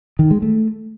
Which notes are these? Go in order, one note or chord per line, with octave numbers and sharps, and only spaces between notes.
D#3
G#3
A3